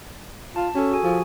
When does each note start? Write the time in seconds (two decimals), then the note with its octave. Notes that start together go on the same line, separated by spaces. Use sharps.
0.56 F4 A5
0.75 C#4 F#4 A4
0.91 F#4 G#4 G#5
1.04 F3